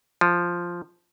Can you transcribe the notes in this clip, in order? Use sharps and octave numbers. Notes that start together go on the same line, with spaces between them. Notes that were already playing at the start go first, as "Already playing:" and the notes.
F3